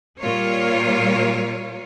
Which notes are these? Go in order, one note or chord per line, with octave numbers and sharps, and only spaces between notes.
A#2 G3 F4 A#4 C#5